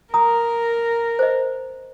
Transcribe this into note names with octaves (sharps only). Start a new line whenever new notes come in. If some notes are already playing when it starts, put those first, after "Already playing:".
A#4 A#5 D#6
C5 D#5